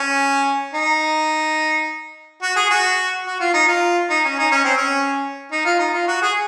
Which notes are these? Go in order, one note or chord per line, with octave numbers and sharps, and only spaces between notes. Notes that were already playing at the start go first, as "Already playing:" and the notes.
Already playing: C#4
D#4
F#4
G#4
F#4
F#4
F4
D#4
F4
D#4
C#4
D#4
C#4
C4
C#4
D#4
F4
D#4
F4
F#4
G#4